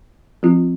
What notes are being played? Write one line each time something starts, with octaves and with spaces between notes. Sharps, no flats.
F3 C4 F4